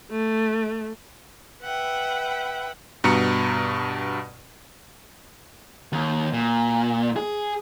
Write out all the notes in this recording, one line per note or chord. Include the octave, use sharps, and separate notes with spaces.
A3
B4 E5 F#5 G5
G2 B2 A#5 C#7
D#2
A#2
G#4